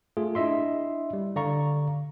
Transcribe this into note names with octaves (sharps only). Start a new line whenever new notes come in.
A3 F4 G#4
D4 E4 D#5 E5 C6
G3
D3 D5 F5 A#5 C#6